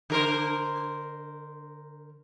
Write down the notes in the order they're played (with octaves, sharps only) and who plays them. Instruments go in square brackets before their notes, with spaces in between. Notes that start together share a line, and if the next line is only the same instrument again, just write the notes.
[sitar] D3 A#4 C5